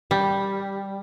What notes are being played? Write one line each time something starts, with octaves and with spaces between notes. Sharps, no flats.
G3